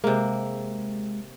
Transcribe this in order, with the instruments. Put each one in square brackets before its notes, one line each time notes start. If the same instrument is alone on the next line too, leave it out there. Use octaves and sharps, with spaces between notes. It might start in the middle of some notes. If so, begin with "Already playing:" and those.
[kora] C3 A#3 [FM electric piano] G#3